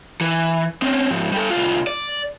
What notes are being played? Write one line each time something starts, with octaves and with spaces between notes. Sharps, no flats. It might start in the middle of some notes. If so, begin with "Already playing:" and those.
E3
C4 C#4
G#2 F3
G3 A4
C2 F4
D5